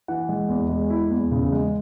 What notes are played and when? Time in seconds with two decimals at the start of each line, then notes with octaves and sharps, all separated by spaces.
0.08 E3 F#5
0.29 G#3
0.49 E2
0.69 G#3
0.90 E4
1.10 E2
1.32 C#3
1.52 G#3